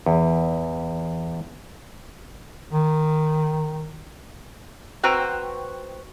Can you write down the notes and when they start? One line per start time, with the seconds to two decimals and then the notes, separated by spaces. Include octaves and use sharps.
0.06 E2
2.73 D#3
5.03 C4 F#4 B4 C5 G5 A#5